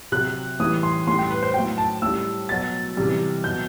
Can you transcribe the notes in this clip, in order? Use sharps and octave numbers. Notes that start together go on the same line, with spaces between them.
C3 F#3 F#6
A2 E3 G3 D#6
C6
A2 G3 C6
G5
B4
C5
A2 F#3 G5
A5
A2 G3 E6
B2 F#3 A6
C3 E3 G3
B2 F#3 G6